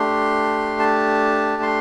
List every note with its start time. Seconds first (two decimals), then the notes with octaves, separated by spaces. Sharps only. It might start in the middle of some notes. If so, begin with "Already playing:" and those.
Already playing: A3 D4 G4 C6
0.79 A5
1.62 C6